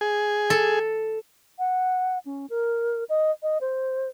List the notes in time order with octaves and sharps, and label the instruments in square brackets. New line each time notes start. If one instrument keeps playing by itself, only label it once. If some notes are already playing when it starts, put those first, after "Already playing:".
[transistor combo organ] G#4
[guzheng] A4
[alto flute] F#5
C#4
A#4
D#5
D#5
C5